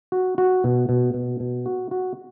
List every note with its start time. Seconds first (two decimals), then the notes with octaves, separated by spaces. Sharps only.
0.12 F#4
0.38 F#4
0.64 B2
0.89 B2
1.14 B2
1.40 B2
1.66 F#4
1.91 F#4